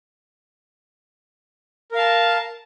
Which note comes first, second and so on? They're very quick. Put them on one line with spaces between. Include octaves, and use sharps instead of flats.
A#4 F5 A5